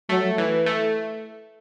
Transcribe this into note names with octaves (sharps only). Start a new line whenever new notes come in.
F#3 A3
E3
A3